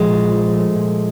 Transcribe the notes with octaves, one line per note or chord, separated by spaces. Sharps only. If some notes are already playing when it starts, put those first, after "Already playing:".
Already playing: A#2 F3 G#3
A#1
F3
A3
A#2